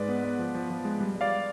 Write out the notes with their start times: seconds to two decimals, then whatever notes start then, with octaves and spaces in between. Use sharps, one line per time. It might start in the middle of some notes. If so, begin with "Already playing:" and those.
Already playing: G#2 G#3 B4 D5
0.09 B3
0.24 B3
0.39 F3
0.55 F3
0.70 F3
0.85 G#3
1.01 G3
1.15 G3
1.21 D5 F5